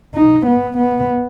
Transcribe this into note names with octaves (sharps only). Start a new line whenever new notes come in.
D#4
B3
B3